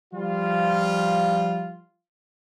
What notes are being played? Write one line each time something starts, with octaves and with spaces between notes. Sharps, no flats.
F3 G3 F4